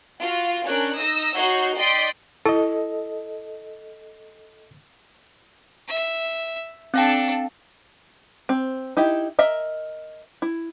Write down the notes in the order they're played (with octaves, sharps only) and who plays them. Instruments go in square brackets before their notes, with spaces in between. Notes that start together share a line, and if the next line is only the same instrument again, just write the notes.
[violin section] F4 F#4
C#4 D4 A#4 F#6
D#4 D#6 E6 A#6
D#4 F#4 C#5 G6 C7
D5 D#5 G5 C6 B6
[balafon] E4 [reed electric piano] A4 D#5
[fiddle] E5
[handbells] C4 F5 G5 [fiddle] D4 A4
[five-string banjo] C4
D#4 E4 G4
A#4 D#5 E5
E4